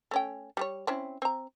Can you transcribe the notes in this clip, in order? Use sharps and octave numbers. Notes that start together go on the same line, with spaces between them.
A3 C#4 G5
G3 G#4 C#5
C4 C#4 E4
C4 A#5